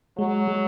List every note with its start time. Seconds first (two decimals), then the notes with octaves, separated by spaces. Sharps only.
0.18 F#3 G#3
0.48 G#3